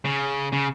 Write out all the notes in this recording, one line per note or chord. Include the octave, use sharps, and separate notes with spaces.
C#3
C#3